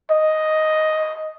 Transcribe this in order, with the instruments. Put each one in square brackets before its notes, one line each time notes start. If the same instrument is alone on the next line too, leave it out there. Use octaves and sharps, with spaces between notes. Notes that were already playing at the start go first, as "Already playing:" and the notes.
[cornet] D#5